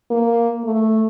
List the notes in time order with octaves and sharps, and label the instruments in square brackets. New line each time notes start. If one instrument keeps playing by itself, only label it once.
[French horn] A#3
A3